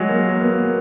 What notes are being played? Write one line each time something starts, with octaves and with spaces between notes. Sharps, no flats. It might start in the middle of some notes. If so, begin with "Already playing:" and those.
Already playing: F#3 G#3
A#3
A#3
B3
A#3